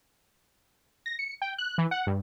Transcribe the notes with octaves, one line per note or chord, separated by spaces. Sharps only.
A#6
C#7
G5
F#6
E3
F#5
G2